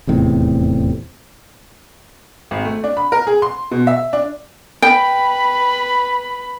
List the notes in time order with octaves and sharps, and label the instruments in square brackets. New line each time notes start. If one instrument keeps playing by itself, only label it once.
[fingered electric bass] D#1 E2 A2 C3
[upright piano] G#1
A3
D4
B5
A#4
G#4
C6
B2
E5
D4
[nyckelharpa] B4 [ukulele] G5 [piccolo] B5